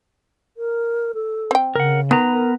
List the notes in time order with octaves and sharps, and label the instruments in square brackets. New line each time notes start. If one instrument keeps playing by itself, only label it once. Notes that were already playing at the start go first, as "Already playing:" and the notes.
[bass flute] A#4
A4
[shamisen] C4 G5
[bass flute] C#3 [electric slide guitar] A#4 F#5
[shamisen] D#3 [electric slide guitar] B3 B4 A#5
[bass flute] A#4